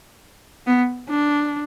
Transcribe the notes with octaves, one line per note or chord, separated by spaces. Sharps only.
B3
D4